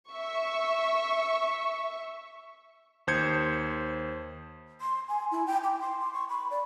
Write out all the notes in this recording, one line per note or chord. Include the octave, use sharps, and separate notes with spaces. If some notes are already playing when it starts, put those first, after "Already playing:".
E5 C#6
D#2 C5 G6 G#6 C#7
C6
G#5
E4
G5
D6
C6
C6
C#6
B5
D5